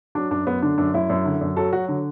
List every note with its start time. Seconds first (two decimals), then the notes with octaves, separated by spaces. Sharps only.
0.15 F#3 D4
0.31 F#2 D4
0.47 F#2 B3
0.62 D3 D4
0.78 F#2 D4
0.94 F#2 E4
1.10 F#2
1.25 D3
1.41 F#2
1.56 F#3 A4
1.73 F#3 F#4
1.89 D3